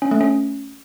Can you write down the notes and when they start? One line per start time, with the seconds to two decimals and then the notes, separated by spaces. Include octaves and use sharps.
0.02 C#4
0.11 A3
0.21 C#4